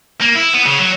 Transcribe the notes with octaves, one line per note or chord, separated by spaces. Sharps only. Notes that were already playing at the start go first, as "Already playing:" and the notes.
A#3
E4
B3
C#3
F#3